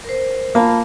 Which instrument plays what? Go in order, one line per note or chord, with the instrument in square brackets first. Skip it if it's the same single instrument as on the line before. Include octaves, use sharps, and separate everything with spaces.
[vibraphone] A#4 C5
[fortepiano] A#3 [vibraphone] F4 A5 B5